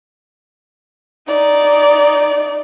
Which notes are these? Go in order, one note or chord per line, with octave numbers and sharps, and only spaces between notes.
D#4 D5